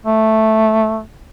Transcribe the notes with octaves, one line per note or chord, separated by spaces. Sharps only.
A3